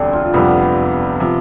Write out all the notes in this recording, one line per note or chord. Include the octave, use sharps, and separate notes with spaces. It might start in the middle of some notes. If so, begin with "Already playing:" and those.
Already playing: E1 D2 D3 G3 C4 D4
F4
F1 F2 C3 G3 B3
C3 F3